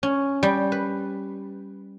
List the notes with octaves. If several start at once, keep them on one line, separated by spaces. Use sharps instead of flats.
C#4
G3
B4